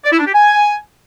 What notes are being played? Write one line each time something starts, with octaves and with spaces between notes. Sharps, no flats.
D5
E4
D4
G4
G#5